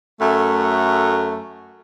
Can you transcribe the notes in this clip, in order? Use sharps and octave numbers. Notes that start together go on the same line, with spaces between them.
F#2 A3